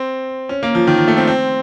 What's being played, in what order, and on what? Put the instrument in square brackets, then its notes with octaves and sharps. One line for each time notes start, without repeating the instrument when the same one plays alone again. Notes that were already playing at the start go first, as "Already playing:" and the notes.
Already playing: [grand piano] C4
C#4
A#3
F3
D#3
F3
A3
C4
C4